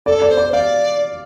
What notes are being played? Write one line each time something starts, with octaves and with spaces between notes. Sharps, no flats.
A4 D5
D5
C5
D5
D5 F5